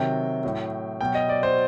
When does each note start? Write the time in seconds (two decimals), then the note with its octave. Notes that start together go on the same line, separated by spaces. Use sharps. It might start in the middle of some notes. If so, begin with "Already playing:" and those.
Already playing: C3 D#3 F#3 G5
0.43 A2 F#3
1.01 B2 F#3 G5
1.15 D#5
1.29 D5
1.43 C5